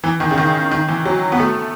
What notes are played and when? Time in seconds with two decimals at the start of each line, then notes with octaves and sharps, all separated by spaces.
0.04 E3
0.20 D#3
0.31 C#3
0.38 D#3
0.71 D#3
0.88 E3
1.05 F#3
1.32 B3
1.39 A3